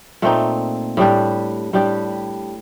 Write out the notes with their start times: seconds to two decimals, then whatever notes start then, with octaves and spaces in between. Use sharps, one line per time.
0.22 A#2 A3 C4 D#4
0.97 A2 G3 D4 G4
1.73 A2 G3 D4 G4